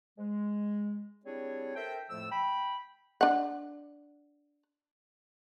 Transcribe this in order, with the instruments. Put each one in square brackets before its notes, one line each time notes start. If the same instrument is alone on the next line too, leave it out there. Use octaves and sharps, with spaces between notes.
[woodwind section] G#3
G3 C4 D4 E4 G#4 C#5
A4 A#4 C5 E5 G5
F2 A2 F3 A3 E6
G5 B5
[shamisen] D4 F#5